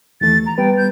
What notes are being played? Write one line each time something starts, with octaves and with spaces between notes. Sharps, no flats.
D#2 E3 A3 A6
A#5
G3 B3 B4 G5
G6